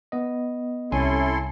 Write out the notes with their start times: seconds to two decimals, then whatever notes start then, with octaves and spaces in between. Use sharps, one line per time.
0.12 B3 D#5
0.92 C2 C#4 E4 A4 G#5 C6